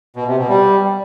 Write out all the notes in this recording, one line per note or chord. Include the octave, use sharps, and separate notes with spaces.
B2
C3
B2
G3